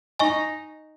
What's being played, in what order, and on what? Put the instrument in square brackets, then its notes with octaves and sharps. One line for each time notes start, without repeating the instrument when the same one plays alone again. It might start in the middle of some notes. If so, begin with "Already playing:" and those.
[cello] D#4 [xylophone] D#5 G#5 C#6